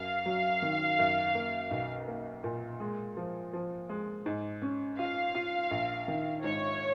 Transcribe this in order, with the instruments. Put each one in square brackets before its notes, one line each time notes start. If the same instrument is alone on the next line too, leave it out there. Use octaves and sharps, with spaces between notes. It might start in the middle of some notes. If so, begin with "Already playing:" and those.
Already playing: [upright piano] F#2 [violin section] F5
[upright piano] F#3
D#3
F#2
A#3
B1
A#3
A#2
G#3
F3
F3
G#3
G#2
C#4
[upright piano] F4 [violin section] F5
[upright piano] F4
A#1
D#3
[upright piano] G#2 [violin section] C#5